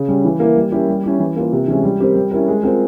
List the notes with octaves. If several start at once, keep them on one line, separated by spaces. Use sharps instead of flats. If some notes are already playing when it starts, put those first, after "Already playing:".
Already playing: C#3
G3 C#4
E3
A#3 E4 A#4
G3
C#4 E4 G4 A#4
G3
C#4 E4 G4
E3
A#3 F4 A#4
C3
E3 G#3 C#4 E4
G3
C4 G4 A#4
G3
C#4 E4 A#4
G#3
C4 F4 A#4